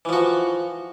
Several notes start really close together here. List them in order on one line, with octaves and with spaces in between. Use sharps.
E3 F3 F#4